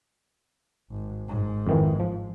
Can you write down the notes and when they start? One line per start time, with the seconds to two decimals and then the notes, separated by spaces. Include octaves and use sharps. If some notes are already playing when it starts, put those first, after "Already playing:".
0.91 G#1
1.28 G#1 G#2
1.67 F2 D#3 E3
2.00 F3